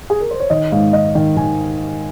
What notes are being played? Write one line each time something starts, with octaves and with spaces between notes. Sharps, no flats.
G#4
A#4
C5
C#5
D#3 D#5
G#2 F5
G#2 D#5
D#3 D#5
D#3 G#5